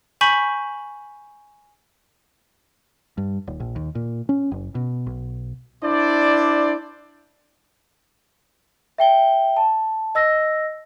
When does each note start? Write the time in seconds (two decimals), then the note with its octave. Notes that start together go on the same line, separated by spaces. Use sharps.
0.21 G#5 B5 C#6 G6 B6 F#7
3.18 G2
3.47 D#1
3.60 A#1
3.76 D#2
3.95 A#2
4.29 C#4
4.52 F#1
4.75 B2
5.07 B1
5.83 D4 E4 C5 D5
8.98 E5 G5 G7
9.57 A5
10.15 D#5 E6 A#6